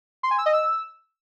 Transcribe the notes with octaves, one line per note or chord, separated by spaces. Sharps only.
C6
G#5
E6
D#5
E6